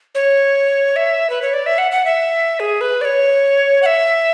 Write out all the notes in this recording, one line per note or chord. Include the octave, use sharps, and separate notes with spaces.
C#5
E5
B4
C#5
D5
E5
F#5
F#5
E5
G#4
B4
D5
C#5
F#5
E5